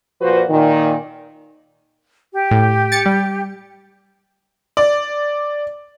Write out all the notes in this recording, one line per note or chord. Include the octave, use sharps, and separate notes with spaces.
A#2 F3 F#4 B4 C5
A#2 D#3
G4
A2
A6 C#7
G3
D5